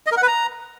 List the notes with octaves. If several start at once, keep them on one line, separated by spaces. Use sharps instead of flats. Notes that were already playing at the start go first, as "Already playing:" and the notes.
D#5
A#4
F#5
B4
A#5